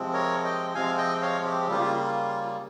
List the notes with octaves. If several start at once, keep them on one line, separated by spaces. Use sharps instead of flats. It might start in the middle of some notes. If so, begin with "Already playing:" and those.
Already playing: C3 F3 G#3 C4
A#4 C#5
D#5 G5
C3 F3 G#3 C4 F5 G#5
D#5 G5
C#5 F5
G4
C#3 G3 A#3 F4 G4
F4
F4